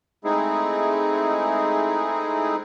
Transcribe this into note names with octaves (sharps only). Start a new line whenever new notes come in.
G#3 A3 C4 D#4 E4 G#4